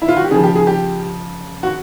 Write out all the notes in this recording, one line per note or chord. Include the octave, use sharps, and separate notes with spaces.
E4
F4
F#4
G4
C#3 F3 G#4
G4
G#4
G4
F#4